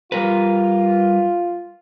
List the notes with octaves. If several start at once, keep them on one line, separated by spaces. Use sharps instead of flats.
G3 F4 A#4 B4